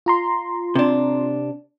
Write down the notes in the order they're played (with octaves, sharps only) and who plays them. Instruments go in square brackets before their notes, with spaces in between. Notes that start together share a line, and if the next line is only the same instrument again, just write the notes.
[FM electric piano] F4 A#5 C6
[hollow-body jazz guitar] C3 D4